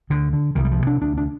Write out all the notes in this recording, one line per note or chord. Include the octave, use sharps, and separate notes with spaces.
D2 D3
D3
C2 D#3
G3
F3
C3
D4
D2 D4
D4